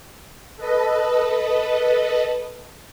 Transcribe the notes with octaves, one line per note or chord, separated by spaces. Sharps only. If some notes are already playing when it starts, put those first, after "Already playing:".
A4 B4 D#5